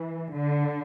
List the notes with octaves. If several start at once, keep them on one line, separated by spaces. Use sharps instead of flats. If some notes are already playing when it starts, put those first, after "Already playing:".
Already playing: E3
D3